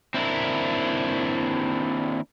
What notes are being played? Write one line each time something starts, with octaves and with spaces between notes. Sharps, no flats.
D#2 C4 D4 E4 A#4